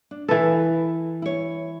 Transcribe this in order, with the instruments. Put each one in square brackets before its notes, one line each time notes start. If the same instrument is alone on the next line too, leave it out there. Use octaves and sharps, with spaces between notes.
[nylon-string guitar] D4
[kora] E3 A4 [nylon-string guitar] B4
[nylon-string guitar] E4 C#5